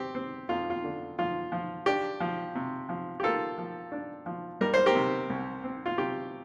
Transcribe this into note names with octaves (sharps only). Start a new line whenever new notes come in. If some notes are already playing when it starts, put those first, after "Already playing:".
Already playing: C4 G4
C4
F2 F4
F4
D3
F3 F4
F3
D4 G4
F3
C3
F3
G4
A#3 F4 A4
F3
D4
F3
G3 A#4
C5
G4 A#4
C3
C2
C4
F4
C3 G4